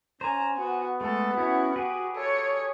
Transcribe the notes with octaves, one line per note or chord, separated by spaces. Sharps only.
C#4 C5 G#5 A#5
B3 F#4
G#3 A3 A4
C#4 E4 F#4
G4 G#4 B4
A4 C#5